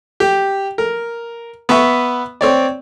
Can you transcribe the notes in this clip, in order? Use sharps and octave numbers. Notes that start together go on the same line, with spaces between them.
G4
A#4
B3 B4 E5 C#6
C4 C#5 D5